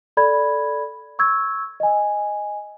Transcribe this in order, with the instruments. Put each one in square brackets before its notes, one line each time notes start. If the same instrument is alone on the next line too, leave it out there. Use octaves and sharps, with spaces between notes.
[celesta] A4 D5 B5 G#6
C#6 E6 G#6
D#5 G#5